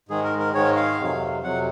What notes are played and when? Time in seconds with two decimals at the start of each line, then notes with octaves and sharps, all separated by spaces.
0.09 G#2 D#3 G#3 G#4
0.24 A#4
0.39 A#4
0.53 G#2 D#3 G#3 C#5
0.76 F5
0.99 F2 C3 F#3
1.44 F2 C3 F#3 F#5